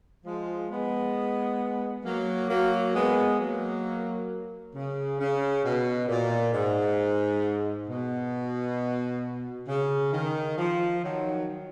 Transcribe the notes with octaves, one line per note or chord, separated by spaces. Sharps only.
F3 G#3
G#3 B3
F#3 A#3
F#3 A#3
G#3 B3
F#3 A#3
C#3
C#3
B2
A#2
G#2
B2
C#3
D#3
F3
D#3 F#3